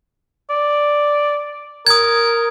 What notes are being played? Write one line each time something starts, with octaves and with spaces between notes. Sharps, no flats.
D5
A#4 D#6 G#6